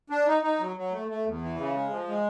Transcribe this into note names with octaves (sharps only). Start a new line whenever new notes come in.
D4
D#4
D#4
F#3
F#3
A3
A3
E2
E3
C#3
G#3
F3
G#3